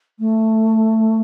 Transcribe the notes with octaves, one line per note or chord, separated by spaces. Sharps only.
A3